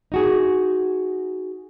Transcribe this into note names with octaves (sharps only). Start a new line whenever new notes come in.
D#4 F#4 G#4